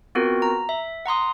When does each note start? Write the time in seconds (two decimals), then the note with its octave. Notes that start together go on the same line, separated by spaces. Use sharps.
0.15 B3 C4 F4 F#4 A#4
0.42 A#5
0.69 E5
1.06 F#5 A#5 C6 D#6